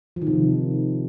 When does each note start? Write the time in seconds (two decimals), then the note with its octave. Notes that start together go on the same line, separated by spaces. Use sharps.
0.16 F3
0.22 D#3
0.27 C3